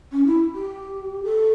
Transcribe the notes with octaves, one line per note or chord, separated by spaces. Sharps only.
C#4
E4
G4
A4